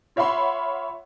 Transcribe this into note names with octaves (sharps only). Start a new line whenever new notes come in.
F4 C#5 E5 F#5 B5 C6